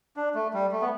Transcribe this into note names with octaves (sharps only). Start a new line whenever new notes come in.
D4
A3
G3
A3
B3